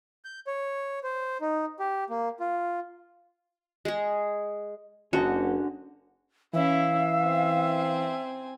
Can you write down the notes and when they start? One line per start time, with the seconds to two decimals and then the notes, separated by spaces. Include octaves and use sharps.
0.25 G6
0.47 C#5
1.04 C5
1.41 D#4
1.80 G4
2.10 A#3
2.40 F4
3.85 G#3 G#4
5.13 F#1 D3 C#4 D#4 F#4 A4
6.54 E3 C#4 E4 E5 F5
7.24 C4 G#5